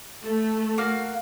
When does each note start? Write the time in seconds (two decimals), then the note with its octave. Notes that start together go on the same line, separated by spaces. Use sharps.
0.25 A3
0.78 A#3 F#4 F5